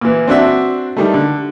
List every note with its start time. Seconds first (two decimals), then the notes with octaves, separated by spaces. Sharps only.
0.01 A#2 E3
0.28 C4 D4 F#4 E5
0.97 D#3 G3 A3
1.14 D3